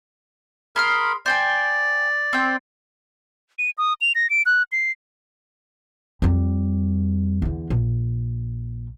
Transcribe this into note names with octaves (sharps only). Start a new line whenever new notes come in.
G#4 A#4 B5 C6 F6
C5 D5 G5 G#5
C4 G5
D#7
D#6
F7
A#6
D7
F#6
C7
F2 G3
E2 D3
A#1